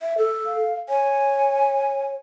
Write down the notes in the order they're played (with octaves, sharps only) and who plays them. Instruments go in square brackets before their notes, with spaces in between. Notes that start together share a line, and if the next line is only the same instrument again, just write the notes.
[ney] E5
A4
[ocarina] F5
[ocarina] C#5 [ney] G#5